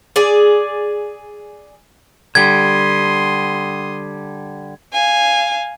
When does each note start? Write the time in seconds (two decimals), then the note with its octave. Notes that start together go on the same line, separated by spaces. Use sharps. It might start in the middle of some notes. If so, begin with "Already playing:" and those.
0.16 G#4 D5
2.35 D3 G3 C6 D#6 G#6
4.93 F5 G#5